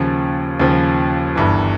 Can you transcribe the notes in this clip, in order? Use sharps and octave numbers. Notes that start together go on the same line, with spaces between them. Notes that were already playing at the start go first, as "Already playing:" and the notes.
Already playing: D#2 C#3 F3
D#2 C#3 F3
G1 G2 E3